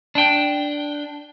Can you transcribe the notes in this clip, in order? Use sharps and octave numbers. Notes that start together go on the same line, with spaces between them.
D4 G5